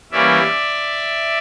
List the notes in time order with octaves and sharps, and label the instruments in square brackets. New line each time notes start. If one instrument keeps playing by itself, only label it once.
[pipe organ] E3 G3 A#3 C#4 D5 E5